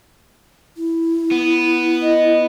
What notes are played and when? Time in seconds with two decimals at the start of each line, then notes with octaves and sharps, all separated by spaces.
0.77 E4
1.31 B3
2.02 D#5